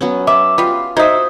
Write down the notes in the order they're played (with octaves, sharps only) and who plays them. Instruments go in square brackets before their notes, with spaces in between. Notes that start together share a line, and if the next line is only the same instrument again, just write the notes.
[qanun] F#3 B3 C#4
[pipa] E5 [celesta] D6
[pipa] G3 B3 [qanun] F4
[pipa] D#4 E5 [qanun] F#4 C5 [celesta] D#6 G#6